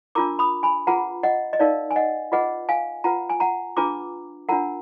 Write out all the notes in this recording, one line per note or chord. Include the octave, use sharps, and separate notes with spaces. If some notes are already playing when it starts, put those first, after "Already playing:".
D4 F4 A#4 A#5 D6
B5 D#6
G#5 B5
F4 G#4 B4 F#5 A#5
D#5 F#5
D#5
D#4 A#4 D5 F5
G#5
D#5 F#5
F4 G#4 B4 D#5 F#5
F5 G#5
F4 B4 F#5 A#5
G#5
F#5 A#5
D4 F4 G#4 B4 A#5 D6
D4 F4 A#4 F#5 A#5